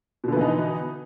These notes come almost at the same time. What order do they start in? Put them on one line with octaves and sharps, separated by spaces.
B2 D3 B3 E3 D#4